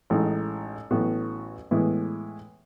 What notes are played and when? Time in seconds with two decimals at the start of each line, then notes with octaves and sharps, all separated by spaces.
0.10 A1 A2 G#3 D#4
0.91 A1 A2 F#3 B3 F#4
1.71 A2 E3 G#3 B3